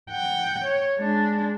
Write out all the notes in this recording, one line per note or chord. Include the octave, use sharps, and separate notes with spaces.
F#5 G5
C#5
G#3 D4